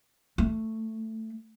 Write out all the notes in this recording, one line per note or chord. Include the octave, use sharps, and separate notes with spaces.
A3